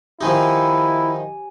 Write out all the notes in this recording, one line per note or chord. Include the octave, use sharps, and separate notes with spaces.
D#3 F3 D#4 E4 G4 G#5